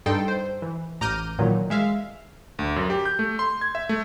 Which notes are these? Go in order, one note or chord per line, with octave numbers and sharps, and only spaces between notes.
G2 D#4 A4 G5 C6
C5
E3
A1 A#5 D6 F6 G6 D#7
A#2 D#3 E3 F#3
G#3 E5 F5
D2
F#2
G4
G6
A3
C6
G#6
E5
A3